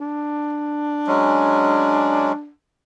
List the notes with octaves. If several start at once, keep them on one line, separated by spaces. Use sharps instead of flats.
D4
F#3 G#3 C#4